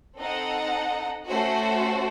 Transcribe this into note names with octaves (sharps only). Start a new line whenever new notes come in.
C4 D#4 A4 D#5 F#5
A3 C#4 F#4 C5